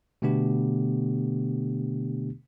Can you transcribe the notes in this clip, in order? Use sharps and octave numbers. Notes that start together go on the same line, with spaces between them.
B2 D3 A3 B3 D4 G4